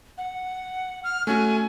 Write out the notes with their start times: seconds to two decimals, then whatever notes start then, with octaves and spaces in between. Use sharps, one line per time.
0.18 F#5
1.04 F6
1.27 A3 C#4 F#4 G#5